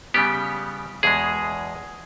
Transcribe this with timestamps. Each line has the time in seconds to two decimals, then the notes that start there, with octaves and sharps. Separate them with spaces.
0.14 C#3 G3 B3 G4
1.03 E2 B2 G#3 G#4